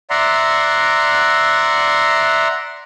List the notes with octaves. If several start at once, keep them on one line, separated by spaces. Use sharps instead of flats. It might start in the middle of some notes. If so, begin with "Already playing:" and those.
D5 E5 F#5 A#5 C6